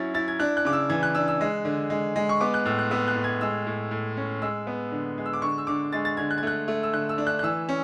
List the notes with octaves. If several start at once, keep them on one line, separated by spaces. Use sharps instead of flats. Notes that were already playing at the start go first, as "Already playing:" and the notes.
Already playing: F#3 C#4 E4 A6
E4 A6
G#6
D4 F#6
F#6
C#3 D6
E6
E3 G#6
F#6
D4 E6
E6
G#3
D3
G#3
G#3
C#6
B3 D6
F#6
A2 E6
F#6
B3 E6
F#6
A2
G#6
G#3 E6
A2
A2
C#4
G#3 E6
B3
D3
G#3
E6
D6
D3 C#6
E6
D3 D6
G#3 A6
A6
D3 G#6
F#6
G#6
A3 F#6
A3
E6
D3 F#6
E6
D4
F#6
F#6
E3 E6
C#4